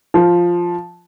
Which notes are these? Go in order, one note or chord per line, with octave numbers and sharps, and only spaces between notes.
F3